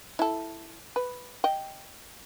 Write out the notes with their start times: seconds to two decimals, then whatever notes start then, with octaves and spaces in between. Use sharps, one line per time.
0.19 E4 A4
0.96 B4
1.44 D#5 G5